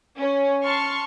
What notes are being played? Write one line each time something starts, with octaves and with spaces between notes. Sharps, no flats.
C#4
A5 C6 C#6 F6